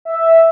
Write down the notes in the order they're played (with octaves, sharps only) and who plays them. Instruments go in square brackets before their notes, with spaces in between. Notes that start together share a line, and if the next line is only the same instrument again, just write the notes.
[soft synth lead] E5